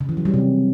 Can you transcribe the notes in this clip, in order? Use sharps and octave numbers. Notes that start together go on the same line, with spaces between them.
C#3
E3
F#3
G3
C3